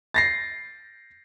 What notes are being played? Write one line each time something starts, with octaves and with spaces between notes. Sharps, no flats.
A6 A#6 C7